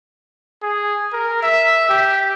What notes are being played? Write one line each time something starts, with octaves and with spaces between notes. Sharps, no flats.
G#4
A#4
E5
G4